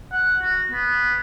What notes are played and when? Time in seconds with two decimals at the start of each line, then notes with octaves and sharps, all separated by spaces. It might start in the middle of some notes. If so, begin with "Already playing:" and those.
0.12 F#5
0.41 F#4
0.71 B3